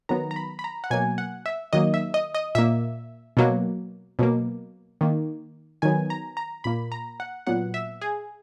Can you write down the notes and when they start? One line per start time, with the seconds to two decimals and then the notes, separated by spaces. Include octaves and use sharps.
0.09 D#3 F#3 B3 A#5
0.31 A#5
0.36 B5
0.59 B5
0.64 A#5
0.84 F#5
0.90 B2 F#3 A#3 G#5
1.18 F#5
1.46 E5
1.73 D#3 F#3 A#3 D#5
1.94 E5
2.14 D#5
2.34 D#5
2.55 A#2 A#3 E5
3.37 B2 F#3 A#3
4.19 B2 F#3 A#3
5.01 D#3 A#3
5.82 D#3 F#3 B3 G#5
6.10 A#5
6.37 A#5
6.64 A#2 A#3 B5
6.92 A#5
7.20 F#5
7.47 A#2 F#3 B3 F#5
7.74 E5
8.02 G#4